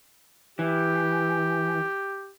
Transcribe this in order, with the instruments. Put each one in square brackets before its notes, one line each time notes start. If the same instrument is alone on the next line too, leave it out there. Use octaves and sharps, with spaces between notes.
[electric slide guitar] E3 [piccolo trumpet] G4